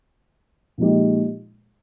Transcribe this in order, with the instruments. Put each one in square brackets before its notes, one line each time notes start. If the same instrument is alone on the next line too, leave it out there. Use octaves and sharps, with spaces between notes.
[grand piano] A#2 F3 G#3 D#4 G4